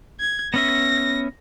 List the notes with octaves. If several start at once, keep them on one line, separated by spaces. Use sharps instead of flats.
G#6
B3 C#4 E5 A#6